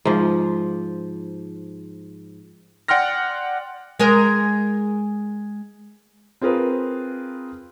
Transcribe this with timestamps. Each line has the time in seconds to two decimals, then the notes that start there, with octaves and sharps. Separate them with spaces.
0.05 G#2 F3
2.88 D5 F#5 G5 C6 F6 A#6
4.00 G#3 G#4 A#4
6.42 C4 F4 G#4 A#4 B4